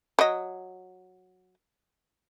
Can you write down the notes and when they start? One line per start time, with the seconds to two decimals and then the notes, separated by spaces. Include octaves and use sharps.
0.19 F#3 D#5